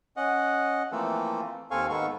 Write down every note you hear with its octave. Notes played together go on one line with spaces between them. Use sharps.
C#4 D#5 F#5
E3 F3 A3 A#3 C4 A4
D#2 C4 A4 F5 G#5 C#6
G#2 D#3 B3 A4 C#6